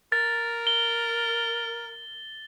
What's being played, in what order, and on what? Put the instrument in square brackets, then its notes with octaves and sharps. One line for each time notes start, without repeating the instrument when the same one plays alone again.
[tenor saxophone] A#4 [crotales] A6
[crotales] G7